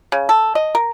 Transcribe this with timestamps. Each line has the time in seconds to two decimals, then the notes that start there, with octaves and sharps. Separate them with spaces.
0.12 C#3
0.29 A4
0.55 D#5
0.75 A#4